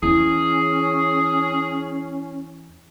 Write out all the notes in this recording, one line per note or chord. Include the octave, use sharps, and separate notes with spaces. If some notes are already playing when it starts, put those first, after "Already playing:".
E2 C#4 E4 G#4